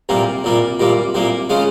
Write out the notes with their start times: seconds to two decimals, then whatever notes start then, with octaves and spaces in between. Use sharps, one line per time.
0.09 C2 A#2 G3 A#3
0.44 C2 A#2 G3 A#3
0.80 C2 A#2 G3 A#3
1.14 C2 A#2 G3 A#3
1.49 C#3 G#3 C#4 F4